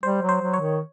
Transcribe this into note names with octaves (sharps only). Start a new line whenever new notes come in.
G3 C5
F#3
C5
F#3
C#5
D#3